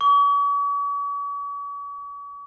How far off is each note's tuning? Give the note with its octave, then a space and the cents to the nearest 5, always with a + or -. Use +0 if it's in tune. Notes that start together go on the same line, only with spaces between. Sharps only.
C#6 +45